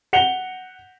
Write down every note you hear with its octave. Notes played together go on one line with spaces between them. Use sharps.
F#5 C#7 F7 G7